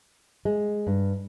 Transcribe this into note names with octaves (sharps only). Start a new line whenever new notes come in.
G#3
G2